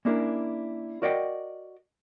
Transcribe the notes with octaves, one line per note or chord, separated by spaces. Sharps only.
A#3 C#4 D4 E4 G#4 A#4
F#4 A#4 D5 D#5 F#5 G5